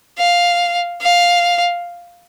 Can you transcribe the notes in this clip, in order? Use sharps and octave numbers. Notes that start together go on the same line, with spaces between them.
F5
F5